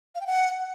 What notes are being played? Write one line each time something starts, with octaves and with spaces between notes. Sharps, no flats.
F5
G5
F#5